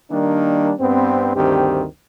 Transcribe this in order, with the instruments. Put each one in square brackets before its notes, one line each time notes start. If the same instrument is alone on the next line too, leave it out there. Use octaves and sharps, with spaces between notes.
[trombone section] D#3 G3 A#3 D4
G2 B3 C4
D2 G2 D#3 C4 G4